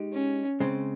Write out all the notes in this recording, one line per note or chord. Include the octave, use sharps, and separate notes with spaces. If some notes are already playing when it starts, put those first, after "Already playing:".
Already playing: G#3 D#4 G4
C#4
C#3 G#3 C4